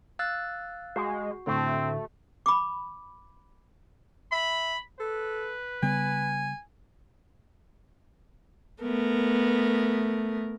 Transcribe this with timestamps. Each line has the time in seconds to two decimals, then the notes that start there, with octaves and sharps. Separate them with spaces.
0.19 F5 E6 F#6 A6
0.96 G#3 F#4
1.47 A2 D3 A3 C4
2.46 B5 D6
4.32 E5 B5
5.00 A4 B4
5.83 C#3 G3 B3 G#5
8.82 A3 B3 A#4